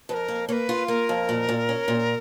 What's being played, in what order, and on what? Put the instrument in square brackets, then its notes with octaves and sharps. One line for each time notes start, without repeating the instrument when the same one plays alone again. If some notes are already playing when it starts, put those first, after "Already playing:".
[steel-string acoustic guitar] F2 [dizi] B4
[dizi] A#4
[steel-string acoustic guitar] A#3
[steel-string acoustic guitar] A#3 [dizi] B4 C#5
[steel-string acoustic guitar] F4
[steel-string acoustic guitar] A#3 [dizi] A#4
[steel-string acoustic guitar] F2
A#2
A#2
C#4
A#2